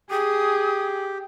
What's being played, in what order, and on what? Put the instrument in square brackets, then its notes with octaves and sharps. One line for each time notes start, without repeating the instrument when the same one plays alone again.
[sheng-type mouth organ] G4 [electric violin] G#4 [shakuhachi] D#6